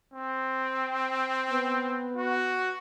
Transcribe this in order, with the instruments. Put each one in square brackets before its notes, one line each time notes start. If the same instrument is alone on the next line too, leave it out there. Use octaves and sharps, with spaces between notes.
[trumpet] C4
[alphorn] B3
[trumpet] F#4